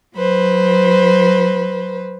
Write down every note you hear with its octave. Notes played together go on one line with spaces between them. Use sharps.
F#3 B4 C5